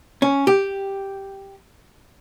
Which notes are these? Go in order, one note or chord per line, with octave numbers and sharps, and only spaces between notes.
C#4
G4